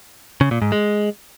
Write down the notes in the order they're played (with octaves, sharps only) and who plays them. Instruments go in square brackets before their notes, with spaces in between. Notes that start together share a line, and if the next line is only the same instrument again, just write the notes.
[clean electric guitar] C#3
A#2
G#2
G#3